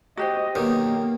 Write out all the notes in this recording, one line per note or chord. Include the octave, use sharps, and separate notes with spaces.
F#4 G4 C5 D#5
B1 D#3 A#3 G4